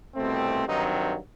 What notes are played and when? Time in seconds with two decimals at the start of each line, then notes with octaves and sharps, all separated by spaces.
0.15 C2 B2 A3 C4
0.67 G2 D#3 F#3 C4 D#4